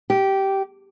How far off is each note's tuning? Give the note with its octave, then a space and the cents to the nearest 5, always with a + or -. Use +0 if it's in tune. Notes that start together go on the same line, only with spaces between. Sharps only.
G4 -15